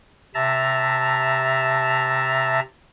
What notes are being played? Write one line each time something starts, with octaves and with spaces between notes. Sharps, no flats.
C3 E5 A5 A#5